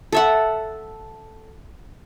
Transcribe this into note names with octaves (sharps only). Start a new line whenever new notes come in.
A4 E5 F#5